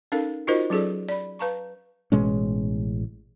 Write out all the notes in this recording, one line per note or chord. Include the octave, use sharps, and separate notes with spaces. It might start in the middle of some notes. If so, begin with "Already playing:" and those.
C#4 D#4 A4 A#4 F5
D#4 F4 F#4 A#4 C5 D#5
F#3 C#4 F4 G#4 A4 D5
D5 B5
B4 F5 A5 A#5 C#6
A1 B2 G#3 C#4